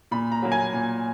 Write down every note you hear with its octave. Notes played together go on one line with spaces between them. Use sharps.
A#2 B5
A#5
F#3 A#3
G#5
A#2